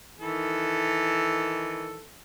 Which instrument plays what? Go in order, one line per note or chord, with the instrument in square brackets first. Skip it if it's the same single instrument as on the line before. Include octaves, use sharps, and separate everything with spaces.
[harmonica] D#3 E3 A4